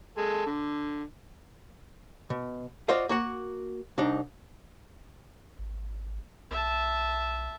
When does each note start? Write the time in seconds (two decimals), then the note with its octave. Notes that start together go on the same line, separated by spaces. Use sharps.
0.17 G#3 A4
0.46 D3
2.30 B2
2.88 F4 F#4 C5 D5 D#5 F5
3.09 A#3 F#4 F#5
3.98 C2 D4 D#4
5.59 G#1
6.51 B1 E5 A5